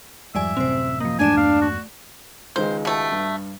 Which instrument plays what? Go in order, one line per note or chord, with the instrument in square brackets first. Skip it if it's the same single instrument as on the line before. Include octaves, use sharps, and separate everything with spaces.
[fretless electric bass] F2 G#2 [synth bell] G3 D5 G#5 [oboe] E5
[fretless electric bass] A1 F#2 C3 [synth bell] C4 C5
[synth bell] F3 A#3 [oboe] D#5
[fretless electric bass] F#1 E2 G#2 [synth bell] A3 D5 E7 [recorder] D4 [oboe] G#5
[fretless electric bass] E2 G2 A#3 [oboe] F5
[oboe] F#4
[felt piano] C#2 D#3 G#3 [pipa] C5
[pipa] B2 A3
[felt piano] G2